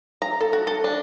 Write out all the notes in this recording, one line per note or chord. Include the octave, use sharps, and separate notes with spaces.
A#5
A4
F#4
A4
D4